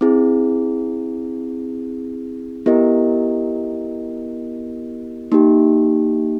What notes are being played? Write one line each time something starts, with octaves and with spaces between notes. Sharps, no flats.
C4 E4 G#4
B3 E4 G4 A#4 D#5
A#3 D#4 G4